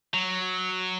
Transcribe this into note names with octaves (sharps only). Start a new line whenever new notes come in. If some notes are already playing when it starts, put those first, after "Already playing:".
F#3